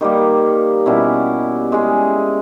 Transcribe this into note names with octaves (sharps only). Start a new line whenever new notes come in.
D#3 G3 A#3
B2 G3 C#4 E4
G#3 C#4 G#4